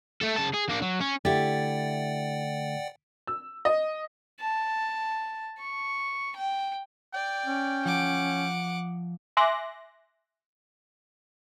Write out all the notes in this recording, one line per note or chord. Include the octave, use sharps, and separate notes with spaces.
A3 A4
C#3 A5
G#4
A#3 D4
F#3
C#4
D3 A3 E4 G4 D5 F#5 G5 A6
E6
D#5
A5
C#6
G5
D5 G5
C#4
F3 F#5 D6
E5 G#5 C6 D6 F#6 A#6